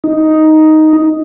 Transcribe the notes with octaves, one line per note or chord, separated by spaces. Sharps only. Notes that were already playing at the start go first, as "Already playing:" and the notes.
D#4